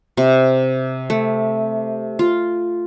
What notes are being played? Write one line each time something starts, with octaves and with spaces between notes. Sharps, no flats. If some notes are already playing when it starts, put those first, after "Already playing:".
C3
A3
F4